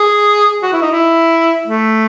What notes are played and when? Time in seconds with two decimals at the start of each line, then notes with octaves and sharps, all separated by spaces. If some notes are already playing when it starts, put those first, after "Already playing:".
Already playing: G#4
0.62 F#4
0.73 E4
0.82 D#4
0.92 E4
1.67 A3